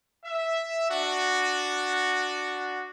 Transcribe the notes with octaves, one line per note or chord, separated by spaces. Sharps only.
E5
D4 F#4